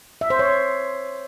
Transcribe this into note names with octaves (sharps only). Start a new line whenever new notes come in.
E5
C5
C#5